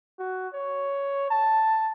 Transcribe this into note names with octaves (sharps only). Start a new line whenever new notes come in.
F#4
C#5
A5